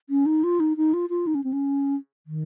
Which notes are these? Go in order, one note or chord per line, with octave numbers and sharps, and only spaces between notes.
C#4
D#4
F4
D#4
D#4
F4
F4
D#4
C#4
C4
C#4
D#3